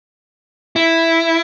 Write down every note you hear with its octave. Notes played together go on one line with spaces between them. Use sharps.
E4